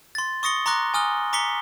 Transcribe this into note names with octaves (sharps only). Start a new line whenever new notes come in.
C6 A6
C#6 D#6 A#6 C#7 G7
A#5 C6 D6 F#6 A#6
G#5 D#6 F6 G7
A#5 D6 B6 C#7 G7